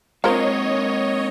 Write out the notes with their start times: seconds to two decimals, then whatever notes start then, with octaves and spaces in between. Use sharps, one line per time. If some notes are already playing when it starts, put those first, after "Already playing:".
0.24 G#3 A#3 C4 F4 A#4 C5 C#5 D#5